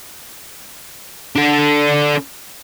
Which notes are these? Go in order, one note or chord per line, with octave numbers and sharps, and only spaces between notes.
D4 A4